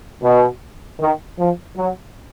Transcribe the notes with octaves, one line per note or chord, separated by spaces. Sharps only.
B2
D#3
F3
F#3